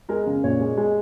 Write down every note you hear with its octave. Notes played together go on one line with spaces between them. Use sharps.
G#3 A#4
C#3
A#2 C#5
G#3
G#3